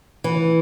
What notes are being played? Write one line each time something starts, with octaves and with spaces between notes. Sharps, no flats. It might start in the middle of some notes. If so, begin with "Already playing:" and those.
E3